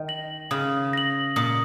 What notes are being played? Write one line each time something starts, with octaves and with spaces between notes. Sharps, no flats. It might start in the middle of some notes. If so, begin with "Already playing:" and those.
Already playing: D#3
A#6 F#7
C#3 D#6
A#6 F#7
A#2 D#6